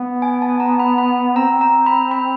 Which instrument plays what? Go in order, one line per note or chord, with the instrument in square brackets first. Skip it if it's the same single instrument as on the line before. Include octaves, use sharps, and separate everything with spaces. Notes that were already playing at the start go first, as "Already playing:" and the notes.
Already playing: [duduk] B3
[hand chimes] G#5
A5
A#5
B5
B5
[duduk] C4 [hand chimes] A#5
[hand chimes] A#5
B5
B5